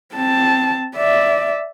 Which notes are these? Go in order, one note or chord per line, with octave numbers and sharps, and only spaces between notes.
C4 A5
D5 E5